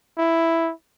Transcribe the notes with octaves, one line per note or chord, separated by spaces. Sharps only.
E4